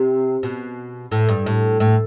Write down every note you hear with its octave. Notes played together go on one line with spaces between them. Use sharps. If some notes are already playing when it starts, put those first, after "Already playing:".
Already playing: C3
B2
A2
G2
A2
A2